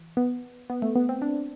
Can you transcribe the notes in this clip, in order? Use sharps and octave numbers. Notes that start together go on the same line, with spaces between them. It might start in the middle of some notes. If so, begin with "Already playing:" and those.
Already playing: E3
B3
B3
A3
B3
C4
D4